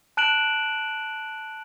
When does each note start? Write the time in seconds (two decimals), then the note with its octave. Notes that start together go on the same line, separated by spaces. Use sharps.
0.17 A5 F#6 D7 E7 F#7